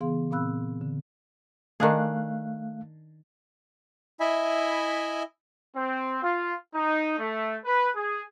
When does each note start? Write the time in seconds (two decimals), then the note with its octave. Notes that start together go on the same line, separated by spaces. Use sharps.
0.01 C#3 E3 B3 G#4 F5 C6
0.31 A#2 C4 F5 B5 E6 F#6
0.81 D3
1.80 D#3 A3 D4 G#4 F5 F#6
4.20 E4 D#5 E5 G#5 B5
5.75 C4
6.22 F4
6.74 D#4
7.19 A3
7.65 B4
7.95 G#4